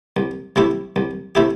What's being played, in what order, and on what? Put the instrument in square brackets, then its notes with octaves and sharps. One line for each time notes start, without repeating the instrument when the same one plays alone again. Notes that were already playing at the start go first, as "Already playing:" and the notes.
[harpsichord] C2
C3 A3 E4 G4
C2
C3 A3 E4 G4